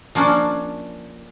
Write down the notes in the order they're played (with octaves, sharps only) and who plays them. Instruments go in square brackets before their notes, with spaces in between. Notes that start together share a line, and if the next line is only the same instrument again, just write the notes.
[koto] F3 A#3 C#4 D4